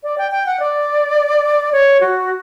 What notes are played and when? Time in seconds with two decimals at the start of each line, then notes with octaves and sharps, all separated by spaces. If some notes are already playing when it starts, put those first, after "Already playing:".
0.03 D5
0.18 G5
0.32 G5
0.46 F#5
0.60 D5
1.72 C#5
2.01 F#4